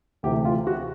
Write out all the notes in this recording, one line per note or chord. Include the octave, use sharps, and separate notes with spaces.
D2 C3 E3 G4
F4
F#4